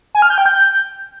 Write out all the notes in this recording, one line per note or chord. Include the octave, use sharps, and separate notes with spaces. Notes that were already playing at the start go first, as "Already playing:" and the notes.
G#5
F6
G6
G5
G6